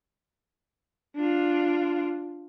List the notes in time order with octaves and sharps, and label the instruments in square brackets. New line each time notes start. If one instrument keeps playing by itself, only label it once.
[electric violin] D4 F4